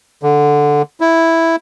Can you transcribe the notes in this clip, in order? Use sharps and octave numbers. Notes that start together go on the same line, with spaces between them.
D3
E4